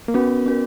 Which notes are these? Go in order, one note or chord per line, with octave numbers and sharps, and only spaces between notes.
A#3
B3 C#4 F#4 A#4
C#4 F#4 A#4